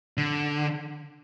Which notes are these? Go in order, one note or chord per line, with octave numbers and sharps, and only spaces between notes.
D3